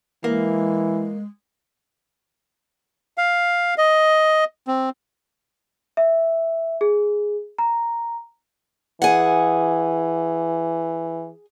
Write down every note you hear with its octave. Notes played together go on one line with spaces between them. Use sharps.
E3 G#3 A#3
F5
D#5
C4
E5
G#4
A#5
E3 G#4 F#5